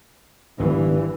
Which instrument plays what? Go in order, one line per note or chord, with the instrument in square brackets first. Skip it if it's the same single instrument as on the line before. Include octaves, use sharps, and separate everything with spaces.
[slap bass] G#1 B3 [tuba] G2 [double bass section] E3